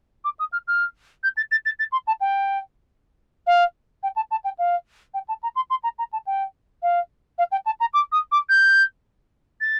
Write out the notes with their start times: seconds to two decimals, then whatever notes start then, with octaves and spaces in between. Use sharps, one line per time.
0.24 D6
0.39 D#6
0.52 F6
0.67 F6
1.23 G6
1.37 A6
1.51 A6
1.65 A6
1.79 A6
1.92 C6
2.07 A5
2.21 G5
3.47 F5
4.03 G5
4.16 A5
4.31 A5
4.44 G5
4.58 F5
5.14 G5
5.28 A5
5.43 A#5
5.56 C6
5.70 C6
5.83 A#5
5.98 A#5
6.13 A5
6.26 G5
6.82 F5
7.38 F5
7.52 G5
7.66 A5
7.80 A#5
7.94 D6
8.12 D#6
8.32 D6
8.49 G6
9.61 A6